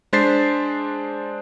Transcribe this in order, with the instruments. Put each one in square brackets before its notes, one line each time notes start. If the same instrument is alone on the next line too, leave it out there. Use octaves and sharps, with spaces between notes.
[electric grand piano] G#3 D4 C5 A6 B6 C7